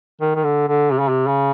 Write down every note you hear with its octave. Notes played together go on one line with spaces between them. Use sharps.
D#3
D#3
D3
D3
C3
C#3
C3
C#3